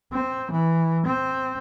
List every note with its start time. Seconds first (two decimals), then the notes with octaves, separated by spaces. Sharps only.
0.12 C4
0.51 E3
1.06 C4